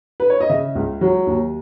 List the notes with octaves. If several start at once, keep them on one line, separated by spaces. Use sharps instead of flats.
B4
C#5
D#5
C#3 E5
C#2
F#3
D#2